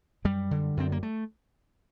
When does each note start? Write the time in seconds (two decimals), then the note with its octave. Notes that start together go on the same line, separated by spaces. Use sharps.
0.25 F#2 G3
0.51 D3
0.77 F#2 C4
0.92 A#3
1.03 A3